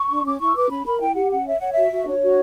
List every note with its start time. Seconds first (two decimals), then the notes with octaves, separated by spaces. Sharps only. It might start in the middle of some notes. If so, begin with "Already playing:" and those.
Already playing: C#6
0.10 D4
0.25 C#4 D6
0.39 E4 C#6
0.48 E6
0.56 B4 D6
0.70 C#4 B5
0.86 A#4 B5
1.00 E4 G5
1.15 G4 F#5
1.31 C#4 F#5
1.46 C#5 E5
1.59 C#5 F#5
1.71 E5
1.77 F#4
1.91 F#4
2.07 D4 C#5
2.22 F#4